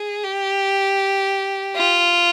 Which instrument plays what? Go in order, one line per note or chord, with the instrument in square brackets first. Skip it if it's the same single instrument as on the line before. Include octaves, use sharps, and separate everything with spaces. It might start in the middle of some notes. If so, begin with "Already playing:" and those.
Already playing: [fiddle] G#4
G4
F4